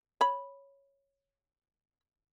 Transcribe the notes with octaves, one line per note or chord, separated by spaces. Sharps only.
C#5 B5